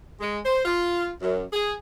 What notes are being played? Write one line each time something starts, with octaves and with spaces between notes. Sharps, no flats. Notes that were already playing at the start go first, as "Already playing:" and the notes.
G#3
C5
F4
F#2
G#4